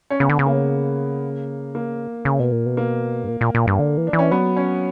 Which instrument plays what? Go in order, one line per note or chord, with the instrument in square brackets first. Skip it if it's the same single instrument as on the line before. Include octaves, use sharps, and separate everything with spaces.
[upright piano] C#4
[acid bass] C#3 [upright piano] B3
[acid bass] D3
C#3
[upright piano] A#3
A#3
[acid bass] C#3
B2
A#2
B2
[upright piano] A#3
[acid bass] G2
A#2
A#2
A#2
G2
D3
E3
[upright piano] D4
[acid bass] E3
[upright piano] C#4
[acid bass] F#3 [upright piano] B3
[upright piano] C#4